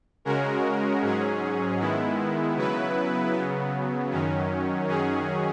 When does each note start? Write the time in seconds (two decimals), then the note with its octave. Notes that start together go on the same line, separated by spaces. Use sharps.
0.25 C#3 G#3 C#4 F#4 A#4
1.02 G#2 F#3 C#4 G#4
1.79 D#3 G#3 B3 E4
2.56 C#3 F#3 B3 E4 B4
3.33 C#3 F#3 B3
4.11 F#2 D#3 F#3 C#4
4.88 F#2 D#3 F#3 C#4 G#4